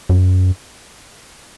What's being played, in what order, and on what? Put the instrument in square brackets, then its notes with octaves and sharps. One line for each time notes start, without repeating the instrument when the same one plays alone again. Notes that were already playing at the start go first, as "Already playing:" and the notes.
[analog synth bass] F#2